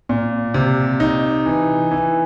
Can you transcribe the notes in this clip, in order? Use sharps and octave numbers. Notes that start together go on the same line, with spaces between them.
A#2
C3
D#4
E3
E3